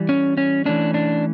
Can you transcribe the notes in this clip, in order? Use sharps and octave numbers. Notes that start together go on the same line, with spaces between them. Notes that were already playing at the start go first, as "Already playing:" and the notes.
Already playing: E3 G3
C#4
C#4
E3 A3 C#4 D4
D4